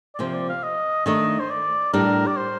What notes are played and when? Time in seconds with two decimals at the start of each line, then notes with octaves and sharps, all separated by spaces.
0.15 D5
0.19 C3 F3 A#3 C5
0.34 D5
0.49 F5
0.63 D#5
1.06 D#3 A3 D4 D#5
1.40 C5
1.50 D5
1.93 A2 G3 D4 A#4
2.27 D5
2.36 C5